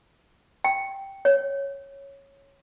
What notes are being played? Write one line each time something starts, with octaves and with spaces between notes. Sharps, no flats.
G5
C#5